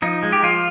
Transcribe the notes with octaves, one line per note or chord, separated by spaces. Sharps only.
F3 D#4
G#3
G4
F3 F4